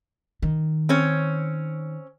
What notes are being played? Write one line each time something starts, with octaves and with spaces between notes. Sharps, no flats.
D#3
C4 C#4 C#5